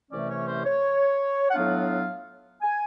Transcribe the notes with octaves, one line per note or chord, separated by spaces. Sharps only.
C2 C3 E3 A3 C#4 D5
C#5
C5
C#5
F#5
A2 F#3 B3 D4 F4 F5
G#5